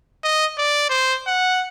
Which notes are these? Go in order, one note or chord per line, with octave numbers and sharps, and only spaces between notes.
D#5
D5
C5
F#5